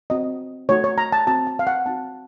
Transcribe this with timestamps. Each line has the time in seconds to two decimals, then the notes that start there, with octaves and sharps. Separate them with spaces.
0.10 C4 F#4 D#5
0.69 A3 D#4 F#4 C#5
0.84 C#5
0.98 A#5
1.12 A5
1.27 C4 F#4 A5
1.47 A5
1.59 F5
1.67 F#5
1.86 C4 D#4 F#4 A5